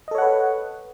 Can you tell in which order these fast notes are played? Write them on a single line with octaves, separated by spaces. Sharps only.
D#5 A4 C#5 F#5 B4